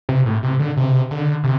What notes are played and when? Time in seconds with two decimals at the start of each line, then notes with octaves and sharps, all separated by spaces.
0.09 C3
0.26 A2
0.43 C3
0.59 D3
0.77 C3
1.11 D3
1.44 C3